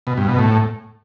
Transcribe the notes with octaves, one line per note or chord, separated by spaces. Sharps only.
B2
G2
B2
A2